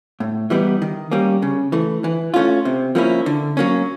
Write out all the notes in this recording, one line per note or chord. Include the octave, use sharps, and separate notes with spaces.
A2
E3 G3 B3 D#4
D#3
G3 A#3 C#4
C#3
E3 A3
E3
A3 C#4 F4
C3
F3 A#3 C#4 E4
D3
F#3 A#3 C#4